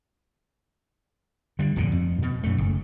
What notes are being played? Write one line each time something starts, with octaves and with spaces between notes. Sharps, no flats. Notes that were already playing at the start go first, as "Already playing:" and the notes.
D3 G3
D1 F2 A#2 D3
F2
B2
F#2 A3
F#1